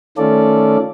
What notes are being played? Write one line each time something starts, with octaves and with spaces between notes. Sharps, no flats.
D#3 A3 C#4 F4 A4 D5